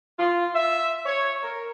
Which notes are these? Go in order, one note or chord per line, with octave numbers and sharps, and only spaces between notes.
F4
E5
C#5
A#4